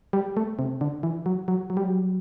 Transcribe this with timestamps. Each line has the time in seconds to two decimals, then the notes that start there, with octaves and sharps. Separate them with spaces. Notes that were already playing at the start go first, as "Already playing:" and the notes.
0.13 G3
0.37 A3
0.59 C3
0.81 D3
1.03 E3
1.26 F#3
1.48 F#3
1.70 F#3
1.77 G3
1.84 F#3